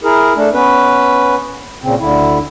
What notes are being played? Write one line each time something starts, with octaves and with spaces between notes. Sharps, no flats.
E4 G#4 A#4
A3 D4
B3 C#4 B4
A#2 C#3 C4
D2 D3 E4